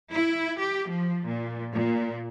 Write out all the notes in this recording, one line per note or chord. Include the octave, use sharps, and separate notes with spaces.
E4
G4
F3
A#2
A#2